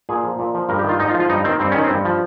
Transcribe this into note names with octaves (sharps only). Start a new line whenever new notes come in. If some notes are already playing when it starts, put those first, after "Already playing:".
A#2 G#4
F3
A#2
F3
G2 A#4
G4
D#3 F4
G#2 D#4
F4
F3
F4
G2 D#4
D#3 C4
G2 C4
D#3 C#4
C4
G2
F3